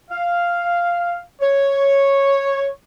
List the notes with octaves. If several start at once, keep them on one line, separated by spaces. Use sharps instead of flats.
F5
C#5